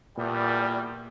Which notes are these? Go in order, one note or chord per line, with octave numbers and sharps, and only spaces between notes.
E2 A#2 G3